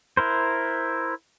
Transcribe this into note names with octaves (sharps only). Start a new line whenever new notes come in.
E4 A#4 C5